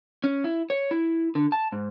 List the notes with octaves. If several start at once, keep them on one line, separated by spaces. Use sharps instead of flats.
C#4
E4
C#5
E4
D3
A5
G#2